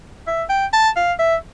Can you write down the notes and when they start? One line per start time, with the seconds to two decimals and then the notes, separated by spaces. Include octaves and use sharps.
0.27 E5
0.50 G5
0.73 A5
0.97 F5
1.19 E5